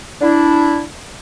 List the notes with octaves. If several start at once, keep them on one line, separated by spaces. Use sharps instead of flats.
D4 E4